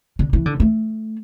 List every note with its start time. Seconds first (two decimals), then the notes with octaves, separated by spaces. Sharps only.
0.19 D3
0.33 E3
0.46 D3
0.60 A3